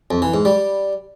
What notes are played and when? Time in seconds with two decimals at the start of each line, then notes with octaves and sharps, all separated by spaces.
0.11 F2
0.22 E3
0.34 G#2
0.45 G3